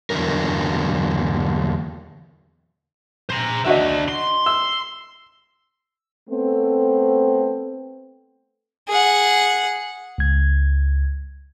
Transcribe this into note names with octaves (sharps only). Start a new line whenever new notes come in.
E2 G2 D3 F#3 A#4
C5 A#5
D4 F#4 D#5 E5
C6
E6
A3 B3 C4
G#4 F#5
C#2 G#6